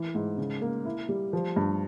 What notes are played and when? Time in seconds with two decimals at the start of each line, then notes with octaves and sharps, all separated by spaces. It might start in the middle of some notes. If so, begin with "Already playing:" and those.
Already playing: E3
0.15 G#2
0.38 C#3
0.61 A#3
0.85 E4
1.09 G3
1.33 F3
1.56 G2